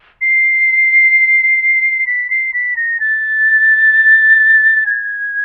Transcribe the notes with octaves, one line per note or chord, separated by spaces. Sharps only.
C7
B6
C7
B6
A#6
A6
G#6